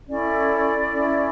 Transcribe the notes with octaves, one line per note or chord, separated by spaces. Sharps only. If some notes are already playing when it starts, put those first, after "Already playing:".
C#4 E4 A4 D5
C#4 E4 A4